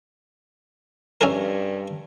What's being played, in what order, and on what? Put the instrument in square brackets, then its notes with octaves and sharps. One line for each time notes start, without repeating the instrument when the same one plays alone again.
[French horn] G2 [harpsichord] C#4 E4 A#4